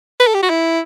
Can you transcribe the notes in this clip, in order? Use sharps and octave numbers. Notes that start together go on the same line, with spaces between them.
B4
A4
G4
F#4
E4